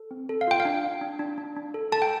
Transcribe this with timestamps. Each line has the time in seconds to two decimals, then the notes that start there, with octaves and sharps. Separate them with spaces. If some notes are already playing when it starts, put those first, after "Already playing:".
Already playing: A4
0.11 C4
0.29 A4
0.41 F5
0.47 F4 G5
0.60 F5
0.65 D4
0.83 D4
1.01 D4
1.19 D4
1.38 D4
1.56 D4
1.74 A4
1.92 A4 A5
2.02 G5